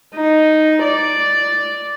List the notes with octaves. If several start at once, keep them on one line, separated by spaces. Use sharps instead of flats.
D#4
D5